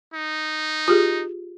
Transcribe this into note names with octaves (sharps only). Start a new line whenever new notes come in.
D#4
F4 G4 G#4